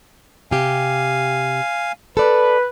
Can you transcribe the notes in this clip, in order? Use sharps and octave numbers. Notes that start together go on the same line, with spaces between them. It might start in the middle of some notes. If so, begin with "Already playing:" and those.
C3 G4 F5 G#5
A4 B4 D5